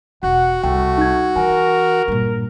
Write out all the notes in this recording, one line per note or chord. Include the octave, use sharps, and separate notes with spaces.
E1 F#4 F#5
C2 A3 G5
D#4 G#6
E3 A#4 F#5 G#5
G2 A#2